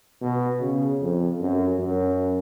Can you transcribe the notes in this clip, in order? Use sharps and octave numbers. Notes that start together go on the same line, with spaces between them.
B2
C#3
F2
F#2
F#2